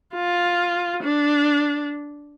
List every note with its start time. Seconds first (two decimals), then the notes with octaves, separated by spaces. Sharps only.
0.14 F4
1.03 D4